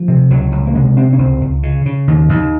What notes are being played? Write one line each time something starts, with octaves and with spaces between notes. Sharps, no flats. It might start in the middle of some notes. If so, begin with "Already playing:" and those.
Already playing: F3
C3
C#2 F#3
C#2
A#3
C3 G#3
C3 C4
C#4
C#2 C4
C#2
C#3
C#3
D#2
D#2